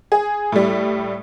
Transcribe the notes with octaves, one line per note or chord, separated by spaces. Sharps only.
G#4
A2 G3